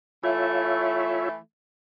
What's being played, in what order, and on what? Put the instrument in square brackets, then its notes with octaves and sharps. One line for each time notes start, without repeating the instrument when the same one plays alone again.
[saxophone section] E3 A3 [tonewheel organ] F4 C#5 E5